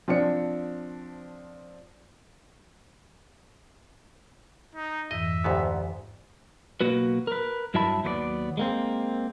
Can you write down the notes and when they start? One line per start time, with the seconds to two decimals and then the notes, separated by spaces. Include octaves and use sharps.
0.08 F3 C4 D4 C#7
4.75 D#4
5.11 F2 G#2 E3 D#5 E5
5.44 D2 G#2 B3 G4 C5 G5
6.81 B1 A#3 F#4 B4
7.27 A#4 B4
7.74 G2 F#3 E4 E5 A5 B5
8.04 D#2 F#3 B3 B4 D5
8.57 G#3 A#3 C4